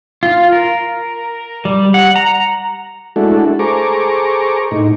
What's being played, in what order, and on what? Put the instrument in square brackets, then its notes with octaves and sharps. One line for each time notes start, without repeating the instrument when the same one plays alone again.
[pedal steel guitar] F4
A#4
G3
F#5
A#5
[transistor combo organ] G#3 A3 D4 E4 F#4 A4
G#4 A4 C5 A#5 C#6 D6
A2 D#4